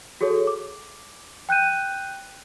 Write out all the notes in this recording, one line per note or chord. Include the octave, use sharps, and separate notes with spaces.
F#4 G#4 A4 C#5
D6
G5 F#6 G6 D#7